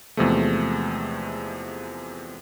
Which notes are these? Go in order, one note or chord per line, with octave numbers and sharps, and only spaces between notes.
E2 C3 F3 G#3 A3